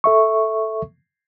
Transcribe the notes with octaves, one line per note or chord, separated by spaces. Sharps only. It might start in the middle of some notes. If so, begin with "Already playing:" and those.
A4 E5 C#6